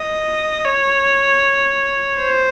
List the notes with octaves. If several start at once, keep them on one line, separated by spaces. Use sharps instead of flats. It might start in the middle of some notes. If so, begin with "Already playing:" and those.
Already playing: D#5
C#5
C5